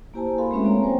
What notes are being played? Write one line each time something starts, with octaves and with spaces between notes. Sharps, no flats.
A#3 E4 G4 C5 G#5 A5
F#4 A4 A#4 F5 B5 C6
G#3 A3 C4 C#4 B4 E5
A#3 C4 C#5 G#5
F#3 C5 C#5 G5